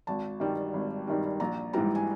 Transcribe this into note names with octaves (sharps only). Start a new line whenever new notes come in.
G#1 A5
G2 D#3 G3
G#1
G2 D#3 G3
A#1 A#5
G#2 E3 G3 A#5
G#5